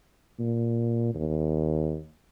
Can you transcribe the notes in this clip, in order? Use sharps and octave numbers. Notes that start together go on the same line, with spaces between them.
A#2
D#2